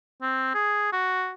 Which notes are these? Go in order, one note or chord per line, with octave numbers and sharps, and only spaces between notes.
C4
G#4
F#4